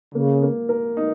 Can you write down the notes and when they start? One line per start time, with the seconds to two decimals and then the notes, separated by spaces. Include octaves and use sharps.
0.15 C#3 A#3
0.43 A#3
0.69 A#4
0.97 D#4